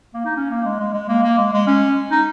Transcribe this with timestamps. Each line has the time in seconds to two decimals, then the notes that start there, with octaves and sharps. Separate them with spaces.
0.14 A#3
0.25 D#4
0.37 C#4
0.50 A#3
0.65 G#3
0.80 G#3
0.94 G#3
1.08 A#3
1.23 A#3
1.38 G#3
1.53 G#3
1.67 C#4
2.11 D#4